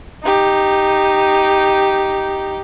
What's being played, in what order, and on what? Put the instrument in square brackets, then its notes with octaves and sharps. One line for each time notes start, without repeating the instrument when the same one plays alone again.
[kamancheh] D#4 G4